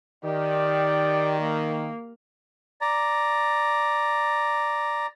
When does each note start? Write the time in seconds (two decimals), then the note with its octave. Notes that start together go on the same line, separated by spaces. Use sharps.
0.25 D#3 G4 D5
1.41 A#3
2.81 D5 A#5